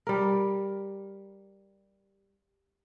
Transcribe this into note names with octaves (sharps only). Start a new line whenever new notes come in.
G3 A#4